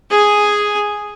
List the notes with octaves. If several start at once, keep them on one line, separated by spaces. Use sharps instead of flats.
G#4 G#5